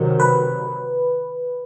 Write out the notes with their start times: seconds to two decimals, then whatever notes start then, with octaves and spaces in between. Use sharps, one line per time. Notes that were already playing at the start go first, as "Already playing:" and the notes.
Already playing: C3 D#3 F#3
0.20 B4